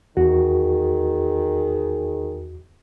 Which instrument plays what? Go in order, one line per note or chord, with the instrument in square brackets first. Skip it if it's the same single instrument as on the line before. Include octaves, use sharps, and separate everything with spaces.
[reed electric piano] E2 F#4 [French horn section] D#3 G#4